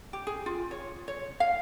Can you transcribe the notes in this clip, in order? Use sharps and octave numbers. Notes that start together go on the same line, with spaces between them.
G4
G#4
F4
C#5
C#5
F5